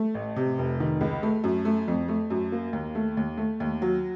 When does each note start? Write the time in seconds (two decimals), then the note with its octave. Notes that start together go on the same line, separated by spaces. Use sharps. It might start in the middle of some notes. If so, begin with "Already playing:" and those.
Already playing: A3
0.15 A1
0.36 C3
0.59 F1
0.80 D#3
1.01 C#2
1.23 A3
1.44 F#2
1.65 A3
1.88 F2
2.08 A3
2.30 F#2
2.52 A#3
2.73 D#2
2.95 A3
3.17 D#2
3.37 A3
3.60 D#2
3.82 F#3